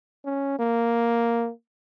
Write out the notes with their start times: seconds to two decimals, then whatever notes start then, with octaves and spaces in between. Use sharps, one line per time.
0.25 C#4
0.59 A#3